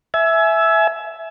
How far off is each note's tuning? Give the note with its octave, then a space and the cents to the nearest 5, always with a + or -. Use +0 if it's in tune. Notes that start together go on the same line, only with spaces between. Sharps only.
E5 +0 G#5 +30